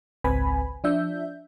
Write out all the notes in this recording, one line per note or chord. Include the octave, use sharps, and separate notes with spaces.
G#1 C#2 C4 B4 G#5 B5
F3 D4 E5 G6